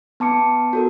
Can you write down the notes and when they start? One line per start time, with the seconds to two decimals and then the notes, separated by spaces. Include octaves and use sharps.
0.20 B3 A5 D6 C#7
0.73 F#4 A4 A#4